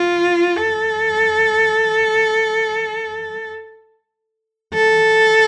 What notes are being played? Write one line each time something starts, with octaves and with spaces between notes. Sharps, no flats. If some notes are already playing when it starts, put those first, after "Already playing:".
Already playing: F4
A4
A4